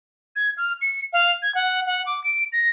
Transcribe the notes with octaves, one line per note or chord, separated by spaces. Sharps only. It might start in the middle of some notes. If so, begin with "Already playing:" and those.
G#6
F6
C#7
F5
G#6
F#5
F#5
D6
D7
A#6